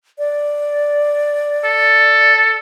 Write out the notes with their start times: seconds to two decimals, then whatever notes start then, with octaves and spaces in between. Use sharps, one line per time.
0.19 D5
1.64 A4